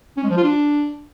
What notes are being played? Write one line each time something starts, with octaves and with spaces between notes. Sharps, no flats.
C#4
G#3
F3
F4
D4